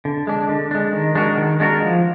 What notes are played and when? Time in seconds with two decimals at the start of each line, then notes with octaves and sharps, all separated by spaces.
0.05 D3
0.27 G#3 D4
0.49 D3
0.71 G#3 D4
0.93 D#3
1.15 G#3 D4 F#4 A#4
1.38 D#3
1.60 G#3 D4 F#4 A#4
1.82 F3